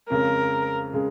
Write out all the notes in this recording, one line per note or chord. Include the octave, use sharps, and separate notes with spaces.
F2 C#3 G#3 C#4 F4 A#4
C#3 G#3